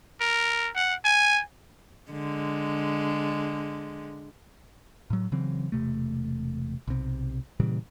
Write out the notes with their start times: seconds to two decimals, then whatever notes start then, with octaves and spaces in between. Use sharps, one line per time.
0.21 A#4
0.75 F#5
1.04 G#5
2.11 D3 G#3
5.10 A2 F#3
5.32 C#3 E3 F#3 C4
5.72 E1 C3 A3
6.88 B1 C3
7.60 A#2 C#3 E3 G3